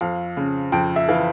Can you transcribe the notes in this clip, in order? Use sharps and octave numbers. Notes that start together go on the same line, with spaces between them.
F2 F5
C#3
F2 G5
E5
E3 F5